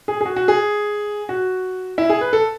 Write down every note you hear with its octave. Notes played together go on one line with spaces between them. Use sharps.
G#4
G#4
F#4
F#4
G#4
F#4
E4
G#4
B4
A4